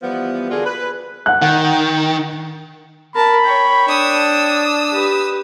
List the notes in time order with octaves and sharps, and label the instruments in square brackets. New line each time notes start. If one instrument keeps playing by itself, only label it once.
[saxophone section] E3 F3 G3 B3
D3 A#3 D4 F4 F#4 G#4
B4
[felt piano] F#5 F#6
[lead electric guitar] D#3 [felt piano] F#5
[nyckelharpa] A#4 A5 [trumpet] B5
[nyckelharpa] C#5 G5
[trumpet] D4 [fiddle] D#6 E6
[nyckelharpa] G4 B4